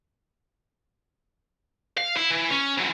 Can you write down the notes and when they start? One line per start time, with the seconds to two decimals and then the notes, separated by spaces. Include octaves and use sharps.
1.97 F5
2.17 E4
2.31 E3
2.51 C#4
2.78 E3 F#3